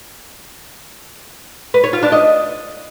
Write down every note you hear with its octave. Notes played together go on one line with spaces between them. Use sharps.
B4
C#5
F4
D4
D#5